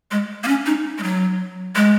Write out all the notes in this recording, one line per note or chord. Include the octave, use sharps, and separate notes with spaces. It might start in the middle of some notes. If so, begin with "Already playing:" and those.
G#3
A#3
C#4
D#4
G#3
F#3
G#3